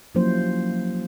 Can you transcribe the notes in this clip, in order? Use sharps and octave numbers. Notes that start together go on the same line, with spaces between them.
F3 F#3 A#3 C#4 E4 C5